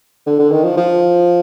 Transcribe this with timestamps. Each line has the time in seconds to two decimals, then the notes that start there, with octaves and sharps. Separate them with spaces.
0.27 D3
0.39 D3
0.51 D#3
0.64 F3
0.77 F3